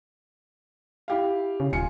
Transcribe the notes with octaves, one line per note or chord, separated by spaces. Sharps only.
E4 G4 F5
C#3
D#1 F4 G#5 C#7